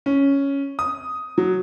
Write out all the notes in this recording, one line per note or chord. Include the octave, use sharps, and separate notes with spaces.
C#4
D#6
F#3